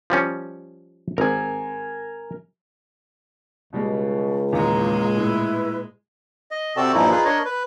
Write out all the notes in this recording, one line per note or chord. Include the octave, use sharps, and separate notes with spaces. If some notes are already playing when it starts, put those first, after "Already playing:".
F3 G3 C#4
G#1 A#4 G#5
C#2 B2 G3 G#3
E2 A#2 D#3 G#3 F5 A#5
A2 E4 B4
D#5
C3 C4 F#4 A4 D5 A5
G2 A#2 E3 F3 D#4 E4
D#4 F4 G#4 B4
D4 A#4 C#5 D#5
B4